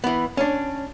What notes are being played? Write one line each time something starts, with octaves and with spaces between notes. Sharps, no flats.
E3 B3
C#4 D4